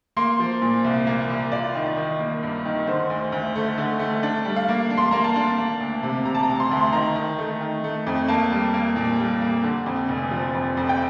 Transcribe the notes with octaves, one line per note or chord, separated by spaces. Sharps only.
A#3 C6
F3
A#2
C2
A#3
C2
F4 D5
D#3
D#3
A#3
G2
D#3
D3 C5
D2
D2
A3
D3
A3
D4
G3
F5
A#3
D4
C6
A#3 A#5
A5
D4
A#3
D2
C3
C3 A#5
A5
A#5
D2
C6
D2
C6
D#3 A#5
D#3
A3
D#3
A3
F2
A#3 A5
G3
A#3
A#2
G3
A#3
D3
F2
F1
F3
F2
F2
G5